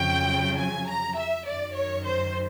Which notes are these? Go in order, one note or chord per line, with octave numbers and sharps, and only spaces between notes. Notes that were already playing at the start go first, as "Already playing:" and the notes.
Already playing: F2 C#3 F#3 G5
G#5
A#5
E5
F#2 D#3 F#3 D5
C#5
C5